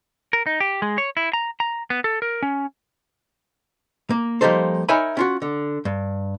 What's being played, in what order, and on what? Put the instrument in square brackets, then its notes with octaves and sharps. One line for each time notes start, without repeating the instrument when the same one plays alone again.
[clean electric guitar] A#4
D#4
G4
G#3
C#5
E4
A#5
A#5
B3
A4
A#4
C#4
[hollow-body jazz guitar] A#3
F3 G3 A#3 D#4 A4 C5
D#4 A#4 C#5 E5 G#5 B5
C#4 F4 F#4
D3
G2